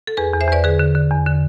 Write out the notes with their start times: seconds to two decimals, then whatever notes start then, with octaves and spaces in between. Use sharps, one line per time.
0.07 A4
0.17 E2 G#4 B4
0.33 E2
0.41 C5 E5
0.49 E2 B4 D5
0.64 D3 G#4 B4
0.80 D3
0.95 D3
1.11 E2
1.26 D3